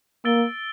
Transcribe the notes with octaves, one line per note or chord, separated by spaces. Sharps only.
A#3 E6 A6 D7 G7